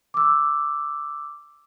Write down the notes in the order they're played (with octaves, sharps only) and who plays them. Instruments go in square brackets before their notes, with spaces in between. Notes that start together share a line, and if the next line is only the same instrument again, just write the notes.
[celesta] D6 E6